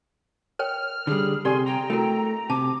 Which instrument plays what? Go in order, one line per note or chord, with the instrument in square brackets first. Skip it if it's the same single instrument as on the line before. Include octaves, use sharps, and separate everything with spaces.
[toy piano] A#4 C#5 G5 [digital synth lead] F6
[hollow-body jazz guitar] D3 G3 [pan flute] G#4
[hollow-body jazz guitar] C3 [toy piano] G4 A4 D5 [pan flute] G#5 [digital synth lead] C6
[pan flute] G5 [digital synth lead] A#5
[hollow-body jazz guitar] A3 [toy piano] E4 F#4 A#4
[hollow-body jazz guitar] C3 [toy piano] A5 [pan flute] D6